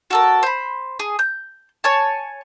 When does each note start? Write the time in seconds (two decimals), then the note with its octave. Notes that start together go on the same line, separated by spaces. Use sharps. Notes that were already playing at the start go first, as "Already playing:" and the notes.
0.10 F#4 A4 A#4
0.43 C5 B5
0.99 G#4
1.19 G6
1.84 C#5 G#5 A5